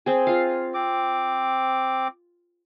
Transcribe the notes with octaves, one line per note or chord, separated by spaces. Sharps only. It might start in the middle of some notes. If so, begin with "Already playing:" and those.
C4 G#4
F4 F5
C4 D6